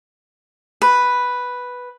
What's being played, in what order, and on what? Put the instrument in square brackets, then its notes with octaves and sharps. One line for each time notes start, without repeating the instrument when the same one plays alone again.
[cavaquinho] B4